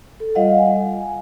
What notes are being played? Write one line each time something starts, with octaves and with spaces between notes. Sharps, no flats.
A4
G3 F4 D#5 F5 F#5
G#5